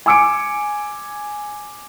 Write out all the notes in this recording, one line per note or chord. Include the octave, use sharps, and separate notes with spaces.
G#5 D6 E6 C#7 D7